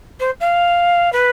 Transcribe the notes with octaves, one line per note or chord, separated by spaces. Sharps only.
C5
F5
B4